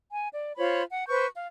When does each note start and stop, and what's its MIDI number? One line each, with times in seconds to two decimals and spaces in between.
0.11 0.30 80
0.33 0.52 74
0.57 0.82 65
0.57 0.82 72
0.57 0.82 73
0.57 0.82 83
0.91 1.07 78
1.08 1.26 71
1.08 1.26 72
1.08 1.26 85
1.08 1.26 91
1.35 1.48 77